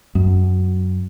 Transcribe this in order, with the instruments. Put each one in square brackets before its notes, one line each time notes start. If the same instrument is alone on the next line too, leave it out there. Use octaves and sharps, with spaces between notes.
[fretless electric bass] F#2